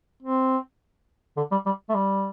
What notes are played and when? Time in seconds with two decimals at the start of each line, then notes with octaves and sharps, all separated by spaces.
0.23 C4
1.37 D3
1.52 G3
1.66 G3
1.89 A3
1.95 G3